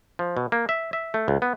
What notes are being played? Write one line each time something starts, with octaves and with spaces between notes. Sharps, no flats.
F3
B2
A#3
E5
E5
A3
C#2
B3